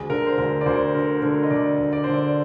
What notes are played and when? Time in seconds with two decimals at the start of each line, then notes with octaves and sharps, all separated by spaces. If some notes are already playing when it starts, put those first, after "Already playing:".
Already playing: D2 G#4
0.10 D3 A#4
0.26 C5
0.38 D2 A#4
0.61 D5
0.66 D2 C5
0.94 D3 A#4
1.22 D3 A#4
1.43 D#5
1.50 D3 D5
1.78 D2
1.93 D5
2.04 D3 C5
2.14 D5